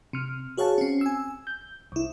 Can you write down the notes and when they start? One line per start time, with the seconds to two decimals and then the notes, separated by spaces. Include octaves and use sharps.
0.13 C3 F6
0.57 F#4 G#4 C#5 F5 F#5 A5
0.78 C4 C#4
1.01 G#5 E6
1.47 G6
1.92 C2 E4